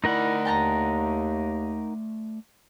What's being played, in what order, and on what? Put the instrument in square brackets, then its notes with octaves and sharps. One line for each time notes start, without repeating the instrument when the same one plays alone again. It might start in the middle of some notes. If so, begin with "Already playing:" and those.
[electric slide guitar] A3 D5 [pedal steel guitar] D#4 A#4 F#5 [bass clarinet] E4
[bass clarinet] D#2 [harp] G5 A5 A#5